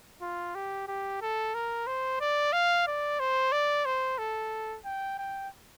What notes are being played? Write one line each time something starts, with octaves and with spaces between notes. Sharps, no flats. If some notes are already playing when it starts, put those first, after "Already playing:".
F4
G4
G4
A4
A#4
C5
D5
F5
D5
C5
D5
C5
A4
G5
G5